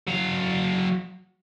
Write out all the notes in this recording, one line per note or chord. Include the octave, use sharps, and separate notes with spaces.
F#3 F5